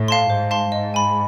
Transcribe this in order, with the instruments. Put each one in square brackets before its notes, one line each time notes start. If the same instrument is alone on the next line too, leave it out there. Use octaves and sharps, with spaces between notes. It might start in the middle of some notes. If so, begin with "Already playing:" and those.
Already playing: [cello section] A2
[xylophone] F5 A5 C6
[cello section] G#2 [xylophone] C5
[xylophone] F5 A5 C6
[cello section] G#2 [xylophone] D#5
[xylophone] G#5 B5